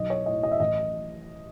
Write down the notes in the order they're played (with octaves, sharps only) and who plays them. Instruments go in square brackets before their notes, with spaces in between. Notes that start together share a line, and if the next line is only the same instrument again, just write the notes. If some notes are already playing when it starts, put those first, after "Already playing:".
Already playing: [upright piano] B1 D#5
C#5
A2 D#5
D#5
E5
A1 D#5